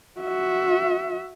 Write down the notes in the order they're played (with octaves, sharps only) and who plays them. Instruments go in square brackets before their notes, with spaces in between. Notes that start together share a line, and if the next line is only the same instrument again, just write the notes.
[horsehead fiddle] F#4 E5